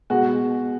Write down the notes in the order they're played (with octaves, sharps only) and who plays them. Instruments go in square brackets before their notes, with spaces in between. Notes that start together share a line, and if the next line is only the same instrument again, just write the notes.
[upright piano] B2 G#3 F#4